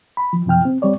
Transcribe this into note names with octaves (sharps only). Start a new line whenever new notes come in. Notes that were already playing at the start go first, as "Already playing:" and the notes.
B5
F3
F#2 C3 F3 G5 F6
C4
G3 C4 C#5 D5